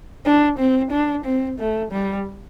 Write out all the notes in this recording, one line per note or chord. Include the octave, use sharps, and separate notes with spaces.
D4
C4
D4
C4
A3
G3